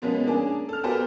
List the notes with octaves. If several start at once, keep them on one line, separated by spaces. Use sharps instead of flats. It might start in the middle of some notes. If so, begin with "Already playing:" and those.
B2 F3 G#3 A#3 B3 C#4
A#3 C#4 D4 G#4
A4 F6
B3 F#4 G4 A4 A#4 C5